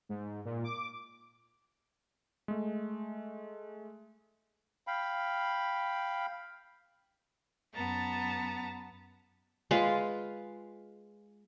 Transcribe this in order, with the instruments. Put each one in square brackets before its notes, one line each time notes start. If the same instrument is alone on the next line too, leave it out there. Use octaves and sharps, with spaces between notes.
[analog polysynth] G#2
A#2
D6
[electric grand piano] G#3 A3
[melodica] F5 G5 B5
[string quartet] F#2 B3 A5 A#5 A6
[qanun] G#3 F4 B4 F5